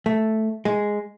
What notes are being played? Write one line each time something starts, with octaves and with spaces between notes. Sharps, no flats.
A3
G#3